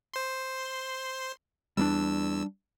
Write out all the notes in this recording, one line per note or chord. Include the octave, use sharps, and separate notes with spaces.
C5 C6
E2 G3 A#3 D4 E6